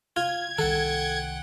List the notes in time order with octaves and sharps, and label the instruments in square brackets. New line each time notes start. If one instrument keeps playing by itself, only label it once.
[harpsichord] F4 [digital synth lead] G#6
[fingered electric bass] C2 D#3 [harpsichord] A4 [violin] F#5 G5